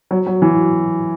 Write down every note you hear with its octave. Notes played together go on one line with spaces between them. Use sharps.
F#3
F#3
E3